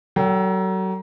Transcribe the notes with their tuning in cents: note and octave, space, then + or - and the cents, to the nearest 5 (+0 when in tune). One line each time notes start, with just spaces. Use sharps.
F#3 +35 A4 +35 G5 +0